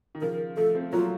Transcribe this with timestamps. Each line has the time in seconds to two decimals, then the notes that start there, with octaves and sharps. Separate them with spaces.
0.15 D#3
0.21 C#3 F3 A#4
0.57 F3 A3 A4
0.75 A3 C4
0.92 F#3 A#3 F4